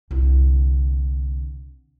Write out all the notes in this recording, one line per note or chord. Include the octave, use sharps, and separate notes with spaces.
C2 D3